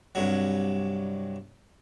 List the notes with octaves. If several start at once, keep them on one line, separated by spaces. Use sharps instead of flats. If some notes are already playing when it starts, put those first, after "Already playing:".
C2 G2 F#3